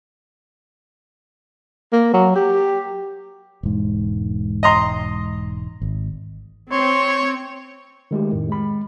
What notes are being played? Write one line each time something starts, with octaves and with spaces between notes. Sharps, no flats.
A#3
F#3
G4
E1 G#2
D#5 A#5 C6
G#1
C4 C#5 C6
D#3 G#3 A3 G4
F2 A2 D#3
G#3 B5